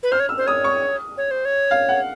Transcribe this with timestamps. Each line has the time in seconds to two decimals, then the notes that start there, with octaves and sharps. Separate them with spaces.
0.03 B4
0.11 C5 F6
0.20 C#5
0.29 E6
0.38 C5
0.47 C#5 D#6
0.64 C#6
1.17 C#5
1.31 C5
1.45 C#5
1.71 F5
1.89 F#5